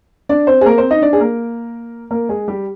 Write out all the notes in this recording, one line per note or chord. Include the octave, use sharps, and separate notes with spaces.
D4 D5
C4 C5
G#4
A#3 A#4
C4 C5
D#4 D#5
D4 D5
G#4
A#3 A#4
A#3 A#4
G#3 G#4
G3 G4